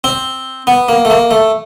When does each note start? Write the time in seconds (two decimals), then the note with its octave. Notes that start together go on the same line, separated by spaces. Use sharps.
0.04 C4
0.67 B3
0.89 A#3
1.05 A3
1.10 A#3
1.31 A3